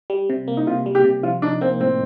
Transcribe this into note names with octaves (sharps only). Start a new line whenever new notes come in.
G3
C3
A#3
D#4
C3 F4
G3
G4
C3
F3 F4
D4 D#4
A#3 C4
A2 C4